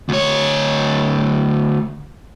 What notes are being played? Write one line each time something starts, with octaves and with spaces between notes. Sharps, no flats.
D2 C#5